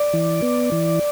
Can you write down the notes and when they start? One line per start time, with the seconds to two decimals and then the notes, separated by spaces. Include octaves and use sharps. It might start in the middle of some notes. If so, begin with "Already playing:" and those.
Already playing: D5
0.13 E3
0.42 B3
0.72 E3